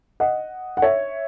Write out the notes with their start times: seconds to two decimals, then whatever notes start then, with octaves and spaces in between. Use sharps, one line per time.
0.20 D#5 F#5
0.77 F#5
0.82 C#5 E5